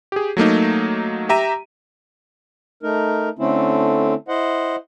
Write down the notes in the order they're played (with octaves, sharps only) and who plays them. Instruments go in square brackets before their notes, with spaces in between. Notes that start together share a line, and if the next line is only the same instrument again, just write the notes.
[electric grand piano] G4 G#4
F#3 A3 A#3 D#4
G4 E5 A#5 D#7
[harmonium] A3 D#4 A#4
D3 A3 C4 C#4 E4
E4 C5 D#5 F#5